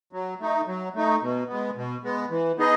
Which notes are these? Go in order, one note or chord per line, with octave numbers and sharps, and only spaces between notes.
F#3
A3 D#4
F#3
A3 D#4
B2
G#3 B3
B2
G#3 B3
E3
B3 D#4 G#4 D#5